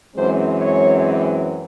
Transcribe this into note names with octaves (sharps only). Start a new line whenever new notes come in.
F#2 E3 G#3 C4 C5
C#5